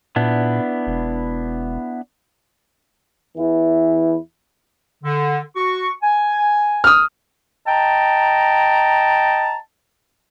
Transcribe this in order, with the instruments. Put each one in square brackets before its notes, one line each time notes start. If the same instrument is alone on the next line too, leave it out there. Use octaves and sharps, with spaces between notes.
[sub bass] A#2 [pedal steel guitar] B3 D4 E4
[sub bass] E1
[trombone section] E2 E3 E4
[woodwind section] D3
F#4 C#6
G#5
[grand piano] D#6 F6
[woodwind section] D#5 G5 A5 A#5